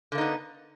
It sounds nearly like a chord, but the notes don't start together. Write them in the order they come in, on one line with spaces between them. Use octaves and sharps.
D3 A#3 D#4 B3